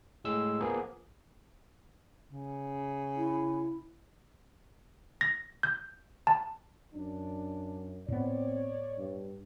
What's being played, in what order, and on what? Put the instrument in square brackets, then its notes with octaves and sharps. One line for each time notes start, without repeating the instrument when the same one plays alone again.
[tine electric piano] A2 G#3 E6
F3 A#3 B3 G#4
[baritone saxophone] C#3
[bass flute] E4
[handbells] A#6
G6
A5
[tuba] F#2 [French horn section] D4
[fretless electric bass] A2 B3 [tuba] C4 [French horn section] C#5 D5
[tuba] G2